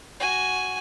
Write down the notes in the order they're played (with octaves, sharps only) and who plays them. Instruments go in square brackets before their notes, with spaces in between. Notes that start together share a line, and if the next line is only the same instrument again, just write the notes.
[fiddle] F#4 G#5